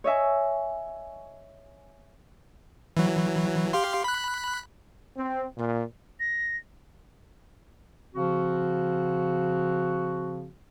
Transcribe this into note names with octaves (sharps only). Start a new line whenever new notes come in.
C#5 D#5 E5 G#5
E3 F#3
G4 F5 C6
B5 F#6
C4
A#2
A#6
C#3 F3 C4 F#4